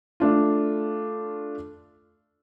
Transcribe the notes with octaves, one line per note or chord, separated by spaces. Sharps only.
A3 D4 F4